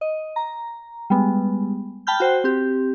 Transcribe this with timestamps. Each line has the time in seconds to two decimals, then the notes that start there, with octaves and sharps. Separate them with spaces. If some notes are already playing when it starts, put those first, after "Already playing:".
0.01 D#5
0.36 A#5
1.10 G3 G#3 B3
2.07 G5 A5 B5 F6 G6
2.20 F#4 C5 G5
2.44 C4 G4